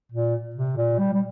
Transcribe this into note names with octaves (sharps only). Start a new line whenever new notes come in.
A#2
C3
A#2
G3
G3